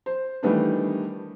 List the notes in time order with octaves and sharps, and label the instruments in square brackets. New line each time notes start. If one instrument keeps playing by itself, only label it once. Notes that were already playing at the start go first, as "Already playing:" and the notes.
[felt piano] C5
D#3 E3 G3 A3 B3 D4